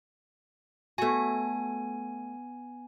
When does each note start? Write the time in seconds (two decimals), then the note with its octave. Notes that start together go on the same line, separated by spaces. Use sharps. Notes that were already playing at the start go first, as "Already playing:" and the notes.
0.98 A3 B3 F#4 G#5